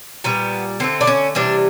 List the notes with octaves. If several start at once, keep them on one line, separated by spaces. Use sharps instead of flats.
A#2 G3 B3
D3 F3 A3 C4
D4
C#4
C3 E3 G3 D4